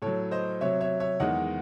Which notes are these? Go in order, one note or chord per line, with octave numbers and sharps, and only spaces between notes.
A2 F#3 A4 C#5
C5 D#5
C3 F#3 C#5 E5
C#5 E5
C#5 E5
E2 D#3 G#3 D#5 F#5